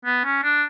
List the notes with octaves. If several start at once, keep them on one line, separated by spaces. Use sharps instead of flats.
B3
C#4
D4